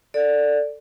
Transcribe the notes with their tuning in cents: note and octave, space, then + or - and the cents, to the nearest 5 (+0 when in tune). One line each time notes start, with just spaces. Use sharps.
A4 +20 D5 +0